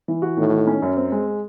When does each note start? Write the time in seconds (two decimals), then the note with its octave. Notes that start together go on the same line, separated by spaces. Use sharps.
0.08 E3
0.22 F#4
0.37 A2 D#3
0.53 D#3
0.67 C#4
0.82 F#2
0.97 C4
1.12 G#3